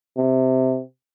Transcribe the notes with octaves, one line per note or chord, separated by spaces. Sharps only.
C3